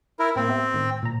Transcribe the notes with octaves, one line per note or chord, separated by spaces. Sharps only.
E4 A#4
A2 A#3 C4
B3 G4 E5
A2 D#3
A#2 A#5